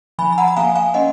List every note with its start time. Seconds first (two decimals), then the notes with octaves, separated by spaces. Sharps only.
0.19 F3 G#5 B5
0.32 B5
0.38 F#5 A#5
0.48 A#5
0.57 A#3 F5 G#5
0.75 F5 G#5
0.94 C#4 D#5 F#5